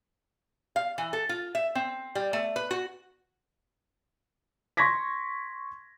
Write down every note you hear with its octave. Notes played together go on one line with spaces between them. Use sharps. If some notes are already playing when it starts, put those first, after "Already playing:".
F5
E3
A4
F4
E5
C4
G3
A3
B4
F#4
C6 C#6 G#6 A#6 B6